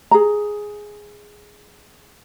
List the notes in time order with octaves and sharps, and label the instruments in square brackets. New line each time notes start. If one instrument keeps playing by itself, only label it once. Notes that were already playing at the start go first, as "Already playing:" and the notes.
[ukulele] G#4 A#5